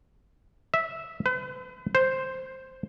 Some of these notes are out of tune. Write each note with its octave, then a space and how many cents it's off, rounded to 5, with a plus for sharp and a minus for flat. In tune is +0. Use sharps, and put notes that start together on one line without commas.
E5 -10
B4 +45
C5 +0